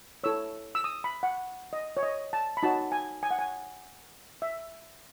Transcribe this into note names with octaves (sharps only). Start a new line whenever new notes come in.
E4 A4 C#5 E6
E6
D#6
B5
F#5
D#5
C#5
D#5
A5
B5
D#4 F#4 C#5 A5
G#5
G#5
F#5
G#5
E5